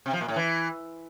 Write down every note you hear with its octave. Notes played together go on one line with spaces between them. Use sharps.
C3
F3
A#2
A2
E3